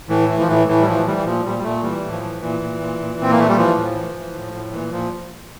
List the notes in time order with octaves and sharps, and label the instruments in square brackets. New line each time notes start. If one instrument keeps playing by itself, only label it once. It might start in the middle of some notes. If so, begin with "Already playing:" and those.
[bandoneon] A2 E3
E3
F3
A2 E3
A2 E3
G3
E3 F3
E3 G3
E3
A#2 F3
A#2 G3
G3
A#2 A3
E3 G3
A2
F3
E3
A#2 E3
A#2
A#2
A#2
A#2 C4
A#3
A#2 A3
G3
E3 F3
A2
E3
E3
A2
A2
A#2 E3
A#2 F3